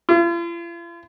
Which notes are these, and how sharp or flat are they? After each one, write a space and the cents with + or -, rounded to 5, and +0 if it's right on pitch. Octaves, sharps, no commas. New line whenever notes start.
F4 -45